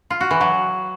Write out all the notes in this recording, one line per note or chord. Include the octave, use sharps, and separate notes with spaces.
F4
F#4
E3
F#3